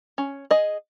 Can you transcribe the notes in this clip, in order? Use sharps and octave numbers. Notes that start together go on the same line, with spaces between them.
C#4
G#4 D#5